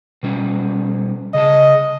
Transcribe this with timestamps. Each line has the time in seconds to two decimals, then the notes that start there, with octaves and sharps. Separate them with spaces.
0.23 B2 G3 C#4
1.34 C#3 G#4 D#5 A5